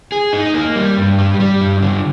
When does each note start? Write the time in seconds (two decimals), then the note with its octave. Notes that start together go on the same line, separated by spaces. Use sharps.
0.12 G#4
0.33 D#4
0.54 A#3
0.76 G3
0.98 G2
1.19 G3
1.40 G3
1.61 G2
1.82 D3